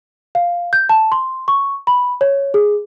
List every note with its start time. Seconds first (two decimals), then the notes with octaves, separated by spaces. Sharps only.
0.35 F5
0.73 G6
0.89 A5
1.12 C6
1.48 C#6
1.87 B5
2.21 C#5
2.54 G#4